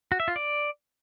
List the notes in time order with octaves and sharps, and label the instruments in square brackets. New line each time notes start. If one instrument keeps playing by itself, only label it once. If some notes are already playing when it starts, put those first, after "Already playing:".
[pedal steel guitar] F#4
E5
F4
D5